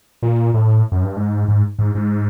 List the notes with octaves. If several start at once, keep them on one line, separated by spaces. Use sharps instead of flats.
A#2
A2
F#2
G2
G#2
G#2
G#2
G#2